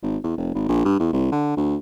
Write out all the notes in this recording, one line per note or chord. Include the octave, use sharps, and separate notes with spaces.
G#1
E2
F1
G#1
A#1
G2
E2
C2
D3
D2